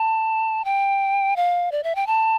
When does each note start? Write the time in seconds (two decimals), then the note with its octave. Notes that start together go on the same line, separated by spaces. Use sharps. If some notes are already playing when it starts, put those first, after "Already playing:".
Already playing: A5
0.65 G5
1.36 F5
1.72 D5
1.84 E5
1.95 G5
2.07 A5